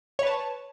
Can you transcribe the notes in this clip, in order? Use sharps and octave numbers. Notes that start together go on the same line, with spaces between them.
B4 C#5 A5